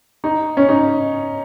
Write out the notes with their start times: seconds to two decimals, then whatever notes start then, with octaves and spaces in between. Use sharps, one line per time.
0.24 D#4
0.57 C#4
0.69 D#4